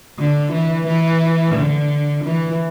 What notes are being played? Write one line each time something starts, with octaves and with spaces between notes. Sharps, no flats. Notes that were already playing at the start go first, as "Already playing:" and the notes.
D3
E3
E3
D3
E3